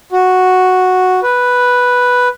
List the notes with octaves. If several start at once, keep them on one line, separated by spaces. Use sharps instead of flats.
F#4
B4